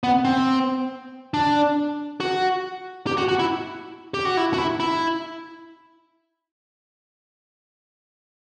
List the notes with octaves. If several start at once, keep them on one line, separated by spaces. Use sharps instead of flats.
B3
C4
D4
F#4
G4
F#4
F#4
E4
G4
F#4
E4
F#4
E4
E4